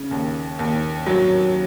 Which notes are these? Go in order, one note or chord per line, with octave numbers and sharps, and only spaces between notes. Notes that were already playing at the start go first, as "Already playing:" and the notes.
Already playing: C#3
D#2
D#2
F#3